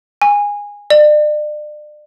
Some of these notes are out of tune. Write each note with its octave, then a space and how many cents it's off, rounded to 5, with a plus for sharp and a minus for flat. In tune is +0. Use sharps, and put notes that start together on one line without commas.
G#5 -15
D5 +35